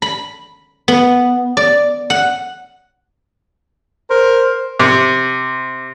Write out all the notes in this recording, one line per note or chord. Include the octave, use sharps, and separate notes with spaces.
B5
B3
D5
F#5
A#4 C5
C3